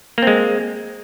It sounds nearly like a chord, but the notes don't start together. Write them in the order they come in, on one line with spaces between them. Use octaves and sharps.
A#3 C4 G#3